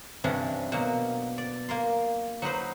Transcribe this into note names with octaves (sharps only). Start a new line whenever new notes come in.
G2 C3 E3 C#4 D4
B2 F#3 A#3
D5
A#3 A#4 C6
F#3 D#4 B4 C5